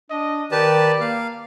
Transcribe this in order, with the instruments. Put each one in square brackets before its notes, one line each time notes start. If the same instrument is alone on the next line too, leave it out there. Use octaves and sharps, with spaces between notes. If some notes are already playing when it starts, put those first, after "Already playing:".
[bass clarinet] D4 [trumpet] D#5
[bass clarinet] D#3 [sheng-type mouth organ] G4 B4 A5 [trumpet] D5
[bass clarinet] A#3 [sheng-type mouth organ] F5